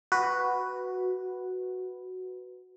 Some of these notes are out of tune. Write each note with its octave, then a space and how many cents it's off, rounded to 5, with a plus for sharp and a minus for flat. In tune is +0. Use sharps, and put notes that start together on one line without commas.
F#4 +0 B4 +0